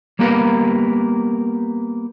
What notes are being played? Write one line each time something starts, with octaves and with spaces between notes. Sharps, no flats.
G3 A#3 B3 G4 A#4 B4